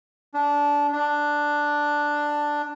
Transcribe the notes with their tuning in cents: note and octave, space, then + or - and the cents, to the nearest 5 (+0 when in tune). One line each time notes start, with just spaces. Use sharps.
D4 -15
D4 +5